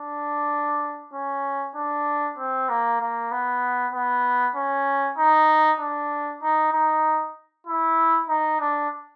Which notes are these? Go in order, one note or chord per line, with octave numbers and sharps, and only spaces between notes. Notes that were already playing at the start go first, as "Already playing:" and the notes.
Already playing: D4
C#4
D4
C4
A#3
A#3
B3
B3
C#4
D#4
D4
D#4
D#4
E4
D#4
D4